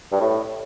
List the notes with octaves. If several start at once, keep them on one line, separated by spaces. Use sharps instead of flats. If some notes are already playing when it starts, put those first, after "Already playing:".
G2
A2